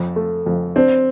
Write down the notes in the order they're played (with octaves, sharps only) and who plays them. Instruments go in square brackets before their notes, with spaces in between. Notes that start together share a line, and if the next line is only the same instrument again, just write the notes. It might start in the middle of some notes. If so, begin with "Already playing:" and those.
Already playing: [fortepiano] F2
A3
F2
[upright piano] C4 [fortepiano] D4